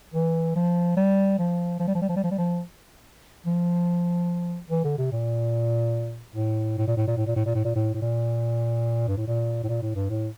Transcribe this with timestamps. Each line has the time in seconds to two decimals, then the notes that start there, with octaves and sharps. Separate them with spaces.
0.14 E3
0.56 F3
0.97 G3
1.39 F3
1.80 F3
1.87 G3
1.95 F3
2.01 G3
2.09 F3
2.16 G3
2.24 F3
2.31 G3
2.38 F3
3.46 F3
4.71 E3
4.84 D3
4.98 C3
5.12 A#2
6.36 A2
6.78 A2
6.87 A#2
6.97 A2
7.07 A#2
7.17 A2
7.27 A#2
7.36 A2
7.45 A#2
7.55 A2
7.65 A#2
7.75 A2
7.94 A2
8.02 A#2
9.08 G2
9.17 A2
9.27 A#2
9.63 A2
9.69 A#2
9.82 A2
9.96 G2
10.10 A2